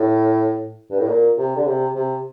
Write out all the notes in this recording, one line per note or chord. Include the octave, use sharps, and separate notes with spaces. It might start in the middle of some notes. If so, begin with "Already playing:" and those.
Already playing: A2
G2
A2
A#2
C3
D3
C3
C3